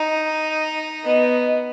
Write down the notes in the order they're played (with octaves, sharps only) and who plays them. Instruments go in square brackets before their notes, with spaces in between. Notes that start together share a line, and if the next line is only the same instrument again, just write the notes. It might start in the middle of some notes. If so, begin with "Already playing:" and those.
Already playing: [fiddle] D#4
[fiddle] B3 [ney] D#5